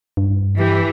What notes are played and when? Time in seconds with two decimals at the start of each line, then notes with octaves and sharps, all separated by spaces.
0.17 G2
0.58 E3 G4